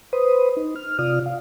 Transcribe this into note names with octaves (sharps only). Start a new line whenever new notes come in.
B4 C5 D#6
D#4
F6
C3 F4 D5 D#6 F6
F5